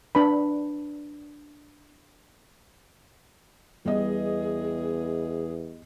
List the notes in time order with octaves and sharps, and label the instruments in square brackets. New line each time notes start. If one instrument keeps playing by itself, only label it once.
[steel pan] D4 B4 B5
[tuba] E2 [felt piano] G3 B3 D#5 [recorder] G#4